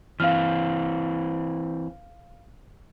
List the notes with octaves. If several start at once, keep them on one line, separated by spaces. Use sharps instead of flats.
E3 C4 F5 F6